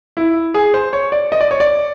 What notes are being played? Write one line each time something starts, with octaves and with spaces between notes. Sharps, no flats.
E4
G#4
C5
C#5
D5
D#5
D5
C#5
D5